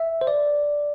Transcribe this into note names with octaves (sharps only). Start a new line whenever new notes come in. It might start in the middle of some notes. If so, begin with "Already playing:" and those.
Already playing: E5
C5
D5